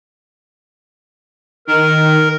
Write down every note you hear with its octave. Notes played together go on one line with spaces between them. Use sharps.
D#3 A#4